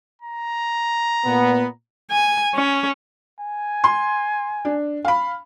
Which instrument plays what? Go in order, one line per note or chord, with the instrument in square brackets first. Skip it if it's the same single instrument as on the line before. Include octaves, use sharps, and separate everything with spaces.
[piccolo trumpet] A#5
[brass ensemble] A#2 B3
[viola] G#5
C#4
[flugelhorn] G#5
[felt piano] C6
D4
F5 B5